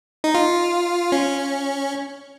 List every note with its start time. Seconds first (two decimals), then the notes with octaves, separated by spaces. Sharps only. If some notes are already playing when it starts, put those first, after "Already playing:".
0.24 D#4
0.34 F4
1.12 C#4